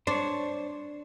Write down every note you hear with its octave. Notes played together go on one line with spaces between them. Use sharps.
D4 C5 C#5